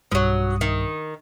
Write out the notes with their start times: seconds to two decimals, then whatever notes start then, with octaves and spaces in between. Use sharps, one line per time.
0.12 B1 G2 F3 F#3 D#6
0.61 D#3